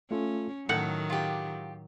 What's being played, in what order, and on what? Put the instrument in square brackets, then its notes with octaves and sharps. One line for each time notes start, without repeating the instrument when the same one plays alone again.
[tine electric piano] A3 F4 A4 [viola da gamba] C#4
[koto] A2 F#5 [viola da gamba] D#3 F#3 [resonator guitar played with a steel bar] A4 [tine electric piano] F#6
[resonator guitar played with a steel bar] F4 G4